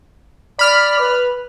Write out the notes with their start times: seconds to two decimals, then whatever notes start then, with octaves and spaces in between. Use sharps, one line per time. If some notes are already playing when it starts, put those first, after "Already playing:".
0.59 D5 B5 F6
0.99 B4